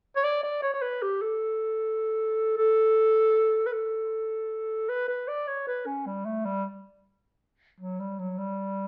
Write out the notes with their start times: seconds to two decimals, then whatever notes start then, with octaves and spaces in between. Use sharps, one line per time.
0.16 C#5
0.24 D5
0.43 D5
0.62 C#5
0.74 C#5
0.82 B4
1.02 G4
1.21 A4
2.57 A4
3.67 B4
3.73 A4
4.89 B4
5.08 B4
5.28 D5
5.47 C#5
5.67 B4
5.86 C#4
6.06 G3
6.25 A3
6.45 G3
7.80 F#3
8.00 G3
8.19 F#3
8.38 G3